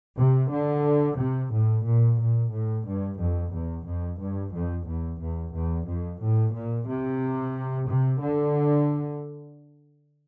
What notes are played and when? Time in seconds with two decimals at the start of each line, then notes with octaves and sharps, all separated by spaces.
0.18 C3
0.51 D3
1.18 C3
1.52 A2
1.85 A#2
2.19 A#2
2.52 A2
2.86 G2
3.19 F2
3.52 E2
3.85 F2
4.19 G2
4.53 F2
4.86 E2
5.20 E2
5.53 E2
5.87 F2
6.20 A2
6.53 A#2
6.87 C3
7.88 C3
8.20 D3